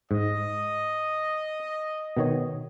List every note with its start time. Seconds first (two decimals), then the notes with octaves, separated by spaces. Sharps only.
0.11 G#2 D#5
2.17 B2 D#3 C#5